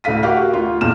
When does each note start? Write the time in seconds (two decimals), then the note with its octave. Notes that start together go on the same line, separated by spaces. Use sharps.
0.04 D2 A2 A4 F5 B6 D#7
0.23 F#4 G4 A#4 F5 F#5
0.37 F#4
0.53 D2 F4
0.81 D#1 G#1 E2 F6 E7